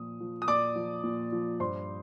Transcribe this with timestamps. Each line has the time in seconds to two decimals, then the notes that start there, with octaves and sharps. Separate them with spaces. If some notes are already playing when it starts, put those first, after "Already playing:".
Already playing: A#2 F3 D#6
0.20 F3
0.42 D#6
0.48 A#2 D5 D6
0.76 F3
1.04 A#2
1.32 F3
1.60 G2 C5 C6